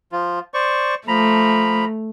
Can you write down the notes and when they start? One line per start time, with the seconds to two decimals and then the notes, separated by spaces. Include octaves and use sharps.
0.12 F3 F4
0.54 C5 D5 C#6
1.08 F3 A3 A#5 B5